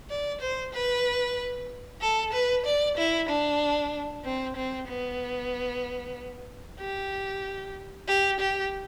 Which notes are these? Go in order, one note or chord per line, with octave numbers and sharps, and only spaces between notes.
D5
C5
B4
A4
B4
D5
E4
D4
C4
C4
B3
G4
G4
G4